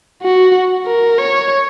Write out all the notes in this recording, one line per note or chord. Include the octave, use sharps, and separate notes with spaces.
F#4
A#4
C#5